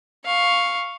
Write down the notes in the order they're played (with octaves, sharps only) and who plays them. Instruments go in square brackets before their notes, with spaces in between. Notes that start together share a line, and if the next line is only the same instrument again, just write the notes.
[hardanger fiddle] F5 C#6